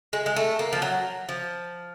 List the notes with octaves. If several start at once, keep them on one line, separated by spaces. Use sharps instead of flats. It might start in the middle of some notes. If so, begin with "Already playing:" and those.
G#3
G#3
A3
A#3
F3
F#3
F3